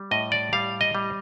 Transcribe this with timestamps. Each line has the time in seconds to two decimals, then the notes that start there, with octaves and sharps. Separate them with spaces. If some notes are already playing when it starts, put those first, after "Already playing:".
Already playing: G3
0.11 A2 D#5
0.32 D5
0.53 G3 F5
0.81 D#5
0.95 G3